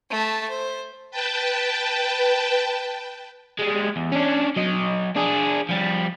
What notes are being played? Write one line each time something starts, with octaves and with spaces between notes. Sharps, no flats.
A3 A5
C5
B4 G5 A5
G3 G#3
E2
C#4 D4
F#3 D#5
D4 G#4
F3 G3